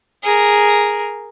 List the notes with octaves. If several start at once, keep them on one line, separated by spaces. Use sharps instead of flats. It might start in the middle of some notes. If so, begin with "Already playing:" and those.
G#4 A#4